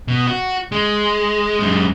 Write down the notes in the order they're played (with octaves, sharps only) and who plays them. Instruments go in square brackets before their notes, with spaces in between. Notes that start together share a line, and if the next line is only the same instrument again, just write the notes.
[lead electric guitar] B2
F#4
G#3
F#2 G#3